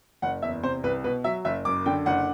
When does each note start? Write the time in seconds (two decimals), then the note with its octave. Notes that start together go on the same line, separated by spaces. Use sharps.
0.22 F#1 F#5
0.42 E2 E5
0.63 C3 C5
0.84 C2 B4
1.04 B2 B4
1.24 F#3 E5
1.45 F#1 E5
1.65 F#2 D6
1.86 D3 G5
2.06 F#1 F#5